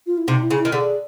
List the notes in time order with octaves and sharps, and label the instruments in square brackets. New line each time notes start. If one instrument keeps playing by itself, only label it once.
[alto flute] F4
E4
[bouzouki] C3 [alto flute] D#4
[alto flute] E4
[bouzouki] C#3
[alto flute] E4
[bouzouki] D#3
[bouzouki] D3 [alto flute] G#4